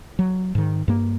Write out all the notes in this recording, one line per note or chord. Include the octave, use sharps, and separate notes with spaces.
F#3
G#2 D#3
G2 A#3